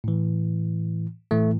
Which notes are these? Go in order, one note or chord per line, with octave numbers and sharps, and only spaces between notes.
A2 E3
A2 E3 A3